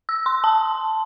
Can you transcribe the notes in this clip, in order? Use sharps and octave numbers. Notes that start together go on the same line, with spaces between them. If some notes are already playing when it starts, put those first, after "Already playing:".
E6
C6
A5